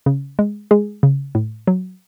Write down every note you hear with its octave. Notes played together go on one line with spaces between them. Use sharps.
C#3
G#3
G#3 G#4
C#3
A2
F#3